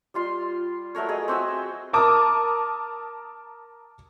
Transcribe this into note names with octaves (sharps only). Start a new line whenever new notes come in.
G3 F4 C6
F#3 A3 A#4 C#5
G#4 B4 D#5
C4 F#4 E5 G#5
A#4 A5 D6 D#6